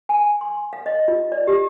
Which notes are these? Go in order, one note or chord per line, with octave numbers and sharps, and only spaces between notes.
G#5
C6
F5
D#5
F4
D5
G4